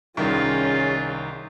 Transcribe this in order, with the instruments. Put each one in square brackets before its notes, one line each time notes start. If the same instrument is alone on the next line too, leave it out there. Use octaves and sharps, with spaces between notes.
[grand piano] C2 D#3 [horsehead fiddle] C#4 G#4 [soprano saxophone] F4